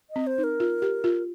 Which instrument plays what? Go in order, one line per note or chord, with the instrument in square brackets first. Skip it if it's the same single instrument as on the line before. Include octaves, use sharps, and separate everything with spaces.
[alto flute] D#5
[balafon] C4
[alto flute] C5
[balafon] D#4
[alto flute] A#4
[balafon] F4
G4
F4